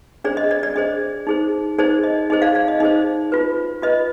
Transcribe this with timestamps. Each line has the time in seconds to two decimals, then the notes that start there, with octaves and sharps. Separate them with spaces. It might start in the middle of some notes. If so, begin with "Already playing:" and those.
0.24 D4 G#4 C5 D5
0.37 D#5
0.51 D5
0.63 D5
0.76 D4 G#4 C5 D#5
1.27 D#4 G#4 C5
1.78 D#4 G#4 C5 D5
2.04 D#5
2.30 D#4 G#4 C5 D#5
2.42 D5 F5
2.55 D5 F5
2.68 D#5
2.80 D#4 G#4 C5 D#5
3.32 F4 B4
3.82 F4 B4 D#5